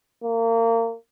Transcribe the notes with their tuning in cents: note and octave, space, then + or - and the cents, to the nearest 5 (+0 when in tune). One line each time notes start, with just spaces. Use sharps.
A#3 -30